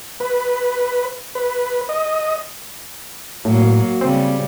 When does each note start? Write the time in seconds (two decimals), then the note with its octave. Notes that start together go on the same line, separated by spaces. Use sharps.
0.20 B4
1.35 B4
1.89 D#5
3.45 A2 F#3 A#3
4.01 C#3 G3 C4